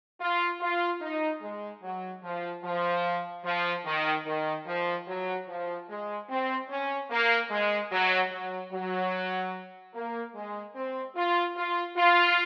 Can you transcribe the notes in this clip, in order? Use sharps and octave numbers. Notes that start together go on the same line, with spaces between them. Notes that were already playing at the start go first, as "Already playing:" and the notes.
F4
F4
D#4
G#3
F#3
F3
F3
F3
D#3
D#3
F3
F#3
F3
G#3
C4
C#4
A#3
G#3
F#3
F#3
F#3
A#3
G#3
C4
F4
F4
F4